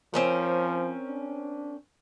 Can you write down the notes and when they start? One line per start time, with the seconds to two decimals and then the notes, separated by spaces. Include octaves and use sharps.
0.14 F3 C4 C#4 A#4
1.08 D4